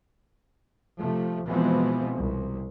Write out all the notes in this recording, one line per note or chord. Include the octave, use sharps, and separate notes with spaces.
C3 F3 A3
B2 E3 F3 G#3 B3 C4
C2